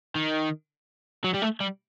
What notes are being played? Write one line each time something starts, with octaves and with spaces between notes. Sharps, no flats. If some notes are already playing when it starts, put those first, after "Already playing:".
D#3
F#3
G3
A3
G3